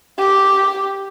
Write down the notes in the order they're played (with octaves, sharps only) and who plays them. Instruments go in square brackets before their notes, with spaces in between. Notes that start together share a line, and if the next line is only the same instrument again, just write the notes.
[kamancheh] G4